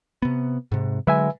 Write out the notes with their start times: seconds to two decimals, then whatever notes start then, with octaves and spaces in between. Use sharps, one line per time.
0.22 C3 B3
0.72 G#2 C3
1.07 D3 F#3 G#3 B4 E5 G#5